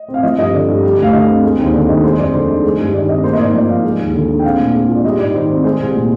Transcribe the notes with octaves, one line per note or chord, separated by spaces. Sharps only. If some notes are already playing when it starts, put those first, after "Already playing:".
Already playing: D#5
C4
F5
F3 D#5
G2 D#5
D3 D5
G2
G3
D2 F5
D3 D#5
C4
G#3
D#2
C5
D3 D5
D#2 D#5
G#3 C5
F2 D5
D3 C5
D#4
G#3
G2
D#3 D5
C4 D#5
A#3 C5
D#5
G#2 D5
F3 D5
G#2 F5
G#3
D#2
D3
D4
G5
C4 F5
A#2
G#3
F4
D5
G3 D#5
G#2 D5
D#3 C5
C4
G#3 C5
C2
A#2